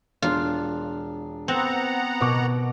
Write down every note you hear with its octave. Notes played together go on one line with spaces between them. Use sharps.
E1 D4 F4
B3 C4 F#5 A#5
B2 C#6 D6